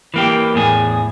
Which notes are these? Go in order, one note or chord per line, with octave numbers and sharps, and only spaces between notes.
E3 A#3 G4
E2 A2 G#4